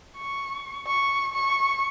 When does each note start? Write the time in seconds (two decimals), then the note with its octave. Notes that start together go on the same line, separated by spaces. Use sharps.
0.17 C#6
0.87 C#6
1.33 C#6